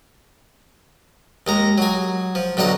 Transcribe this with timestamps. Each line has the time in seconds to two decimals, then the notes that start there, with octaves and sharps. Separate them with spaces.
1.47 D#2 G#3 A#5
1.78 F#3 G#4
2.35 F3
2.57 B1 D3 F#3 D#4 F#5